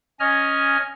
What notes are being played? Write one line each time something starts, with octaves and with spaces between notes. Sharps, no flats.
C#4 D#5 G#5 F6